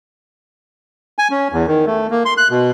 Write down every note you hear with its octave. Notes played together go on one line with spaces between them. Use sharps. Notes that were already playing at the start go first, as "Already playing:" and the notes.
G#5
C#4
E2
D#3
A3
A#3
C6
F#6
B2